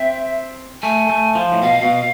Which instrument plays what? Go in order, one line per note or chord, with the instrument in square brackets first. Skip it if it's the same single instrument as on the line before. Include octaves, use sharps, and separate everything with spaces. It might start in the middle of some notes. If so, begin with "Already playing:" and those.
Already playing: [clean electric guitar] C4 [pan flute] E5
[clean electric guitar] A3 [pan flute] G#5
[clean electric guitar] A3
F3
A2
[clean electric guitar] B2 [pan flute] F5
[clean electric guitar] B2